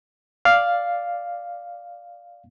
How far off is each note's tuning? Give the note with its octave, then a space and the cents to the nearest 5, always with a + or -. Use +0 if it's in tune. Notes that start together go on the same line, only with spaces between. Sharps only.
D5 +0 F5 +0